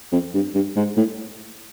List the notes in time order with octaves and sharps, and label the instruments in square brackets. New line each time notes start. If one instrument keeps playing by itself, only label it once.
[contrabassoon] F2
G2
G2
G#2
A2